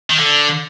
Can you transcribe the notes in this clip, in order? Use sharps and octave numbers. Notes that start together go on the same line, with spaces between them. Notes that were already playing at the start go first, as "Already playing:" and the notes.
D#3
D3